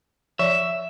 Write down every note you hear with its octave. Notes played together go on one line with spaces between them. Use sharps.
F3 D5 E5